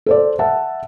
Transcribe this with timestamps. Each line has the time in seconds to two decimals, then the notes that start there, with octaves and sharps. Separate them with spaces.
0.06 A4 C5 D5
0.39 E5 F#5 A5